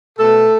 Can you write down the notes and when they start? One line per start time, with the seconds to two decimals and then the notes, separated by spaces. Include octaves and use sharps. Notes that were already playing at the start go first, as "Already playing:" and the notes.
0.18 B2 A3 A4